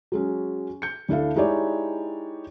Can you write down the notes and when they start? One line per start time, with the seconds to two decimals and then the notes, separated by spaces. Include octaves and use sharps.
0.12 F#3 G#3 C#4
0.82 G6 C#7
1.09 D2 D4 E4 A4 F5
1.36 G#3 D#4 E4 G4 C#5 D5